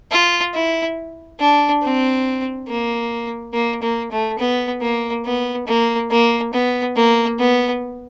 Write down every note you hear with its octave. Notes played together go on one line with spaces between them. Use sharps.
F4
E4
D4
C4
A#3
A#3
A#3
A3
B3
A#3
B3
A#3
A#3
B3
A#3
B3